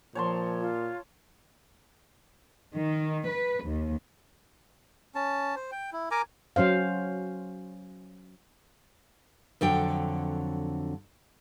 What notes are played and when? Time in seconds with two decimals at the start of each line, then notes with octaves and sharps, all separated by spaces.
0.15 A#2 F3 C#5 A5 C6
0.61 F4
2.75 D#3
3.29 B4
3.65 D#2
5.15 C#4 A5
5.56 C5
5.72 G5
5.93 E4
6.11 A#4 G#5 A#5 D6
6.56 F#3 C#4 C5 F5
9.61 F2 D3 F#3 G5